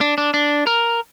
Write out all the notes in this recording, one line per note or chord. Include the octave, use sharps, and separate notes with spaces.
D4
D4
D4
A#4